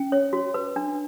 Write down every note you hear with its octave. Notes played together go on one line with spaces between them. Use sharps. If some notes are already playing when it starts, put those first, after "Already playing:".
Already playing: C#4 G5
C#5
F#4
B4
D4